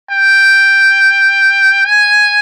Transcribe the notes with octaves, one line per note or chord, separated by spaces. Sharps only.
G5
G#5